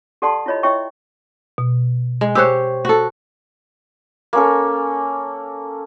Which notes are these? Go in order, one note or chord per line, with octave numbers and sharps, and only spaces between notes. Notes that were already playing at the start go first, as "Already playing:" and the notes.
G4 A4 D5 F#5 A5 C6
E4 F4 C#5 D#5 B5
E4 C#5 D#5 E5 G5 C#6
B2
G#3
G4 C5 C#5 E6 F#6
F#4 A4
A#3 C#4 A4